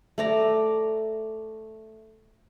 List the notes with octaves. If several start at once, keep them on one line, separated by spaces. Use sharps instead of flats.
A3 D5 A#5